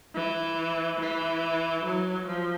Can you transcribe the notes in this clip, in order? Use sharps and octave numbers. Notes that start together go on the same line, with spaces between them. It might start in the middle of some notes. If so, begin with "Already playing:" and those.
E3
E3
F#3
F3